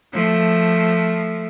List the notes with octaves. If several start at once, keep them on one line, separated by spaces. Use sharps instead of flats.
F3 A3